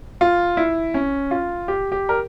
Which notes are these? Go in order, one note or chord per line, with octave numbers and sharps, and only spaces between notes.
F4
E4
C#4
F4
G4
G4
A#4